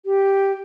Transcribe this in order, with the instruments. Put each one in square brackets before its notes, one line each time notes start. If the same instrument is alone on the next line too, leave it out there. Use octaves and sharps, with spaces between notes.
[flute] G4